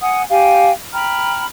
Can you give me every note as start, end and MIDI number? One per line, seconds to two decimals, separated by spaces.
0.01 0.22 78
0.01 0.22 80
0.01 0.22 87
0.30 0.70 67
0.30 0.70 77
0.30 0.70 79
0.30 0.70 80
0.93 1.44 79
0.93 1.44 82
0.93 1.44 83
0.93 1.44 89